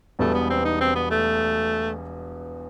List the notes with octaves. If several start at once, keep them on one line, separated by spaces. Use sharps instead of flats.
E1 E2 B2 G3 A3
B3
C4
D#4
C4
B3
A3